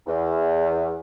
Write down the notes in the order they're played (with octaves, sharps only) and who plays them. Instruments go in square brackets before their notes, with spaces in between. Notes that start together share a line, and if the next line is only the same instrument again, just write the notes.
[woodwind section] E2